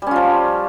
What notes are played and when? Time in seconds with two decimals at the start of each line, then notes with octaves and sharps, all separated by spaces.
0.02 G3
0.07 C#4
0.11 F4
0.16 F3